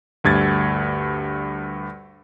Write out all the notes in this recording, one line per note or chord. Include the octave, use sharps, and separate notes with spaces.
D2 G2 G#6 A6